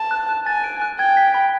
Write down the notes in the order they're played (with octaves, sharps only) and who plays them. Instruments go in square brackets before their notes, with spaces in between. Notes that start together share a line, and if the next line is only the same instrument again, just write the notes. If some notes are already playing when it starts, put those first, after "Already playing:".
Already playing: [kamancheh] A5
[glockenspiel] F#6
F#6
[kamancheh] G#5 [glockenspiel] A6
[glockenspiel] D7
F#6
[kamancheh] G5 [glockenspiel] G#6
[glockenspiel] B6
B5